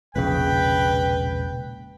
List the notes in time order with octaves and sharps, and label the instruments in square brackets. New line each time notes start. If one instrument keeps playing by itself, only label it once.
[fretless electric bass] E1 A#1 C#3 [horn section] B4 G5